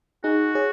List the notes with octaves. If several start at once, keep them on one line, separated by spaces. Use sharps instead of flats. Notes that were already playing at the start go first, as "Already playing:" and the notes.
D#4 F#4 G#4
G#4 C#5